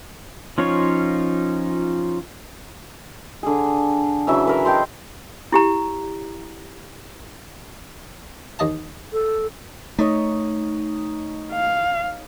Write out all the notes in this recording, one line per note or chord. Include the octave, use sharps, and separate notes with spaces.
F3 C#4 D#4 F4 C#5
D3 G#4
C#3 E3 F#3 E5
A#4 B4
D#5 G5 A5 C6
E4 G4 A#5
D#2 D#5 A5
A4
A3 D#4 C#5 D#5
F5